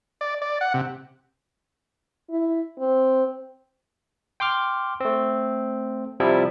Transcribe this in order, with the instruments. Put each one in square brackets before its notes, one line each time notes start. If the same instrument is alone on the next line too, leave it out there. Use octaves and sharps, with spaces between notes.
[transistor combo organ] D5
D5
F#5
C3
[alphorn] E4
C4
[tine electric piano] G5 C6 D6 F6
A3 C4
C3 F3 G3 E4